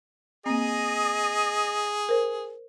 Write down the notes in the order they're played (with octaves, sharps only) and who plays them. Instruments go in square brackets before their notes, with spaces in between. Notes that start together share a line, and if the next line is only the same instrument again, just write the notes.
[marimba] A#3 C4 [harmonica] G#4 [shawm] D#5
[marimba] A#4 C5